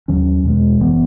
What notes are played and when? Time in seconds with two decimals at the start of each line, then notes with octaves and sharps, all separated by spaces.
0.08 D#2 D#3 F#3 C#4
0.44 E2 B2 G#3
0.80 F#1 F#2 E3 B3